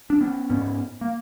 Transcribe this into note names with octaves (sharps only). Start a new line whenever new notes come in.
D4
B3 C#4
G#2 B3 C#4
A#3